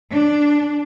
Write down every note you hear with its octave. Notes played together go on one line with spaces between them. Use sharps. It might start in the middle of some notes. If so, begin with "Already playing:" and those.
D4